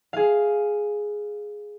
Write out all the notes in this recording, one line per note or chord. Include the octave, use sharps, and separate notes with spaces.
G#4 F5